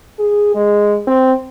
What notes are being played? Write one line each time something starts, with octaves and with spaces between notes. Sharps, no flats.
G#4
G#3
C4